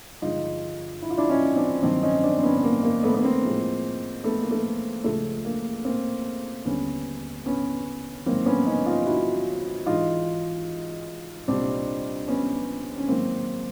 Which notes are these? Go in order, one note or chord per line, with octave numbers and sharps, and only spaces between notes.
G2 D3 F3 G#3 D#4 F4
E4
F4
D4 E4
C#4 D#4
C4 D4
G2 D#3 F#3 C4 D4
C#4 D#4
C4 D4
C4
B3 C#4
B3
A#3
A#3
A3 B3
B3
A#3 C4
A2 F3 G#3
A3 B3
A#3
A3
C#2 C#3 F3 G#3 A3
A#3
A#3 C4
D#2 D3 G3 B3 C#4
B3 C#4
G#2 D#3 F#3 A#3 C4
B3 C#4
C#4 D#4
D#4 F4
E4 F#4
G#2 E3 G#3 D#4 F4
C2 A#2 G3 C4 D4
B3 C#4
C#4
G#2 D#3 F#3 A#3 C4